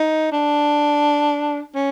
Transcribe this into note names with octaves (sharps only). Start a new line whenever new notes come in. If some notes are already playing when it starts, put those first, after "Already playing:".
Already playing: D#4
D4
C#4